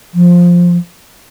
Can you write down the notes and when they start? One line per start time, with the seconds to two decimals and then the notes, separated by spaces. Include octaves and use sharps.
0.14 F3